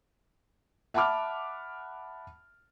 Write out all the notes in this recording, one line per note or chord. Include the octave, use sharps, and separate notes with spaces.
E5 F#5 A5 B5 D6 F6